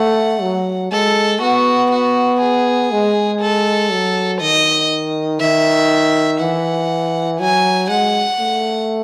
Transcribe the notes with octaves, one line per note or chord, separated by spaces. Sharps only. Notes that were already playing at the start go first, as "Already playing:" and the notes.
Already playing: A3 F#5
F#3
G#3 A4
B3 F#4
F#4
G#4
G#3
A4
F#3
D#3 D#5
D#3 E5
E3 F#5
F#3 G#5
G#3 F#5
A3